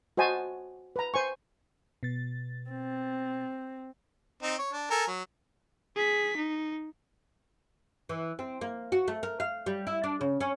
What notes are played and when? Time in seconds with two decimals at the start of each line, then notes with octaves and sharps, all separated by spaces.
0.17 F#4 C5 D#5 G#5 A5
0.96 B4 A#5
1.14 C5 G#5 C#6
2.03 B2 A6
2.71 C4
4.43 C4 D#4
4.59 C#5
4.73 D4
4.91 A4 A#4 G#5
5.07 F#3
5.96 G#4 B6
6.37 D#4
8.09 E3
8.39 C4
8.61 A#3
8.92 F#4
9.08 A3
9.23 A#4
9.40 F5
9.66 G3
9.87 E4
10.04 D4
10.21 C#3
10.41 C#4